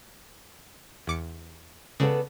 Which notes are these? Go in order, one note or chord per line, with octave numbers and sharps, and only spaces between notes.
E2 D6 C#7
C#3 B3 A4 D5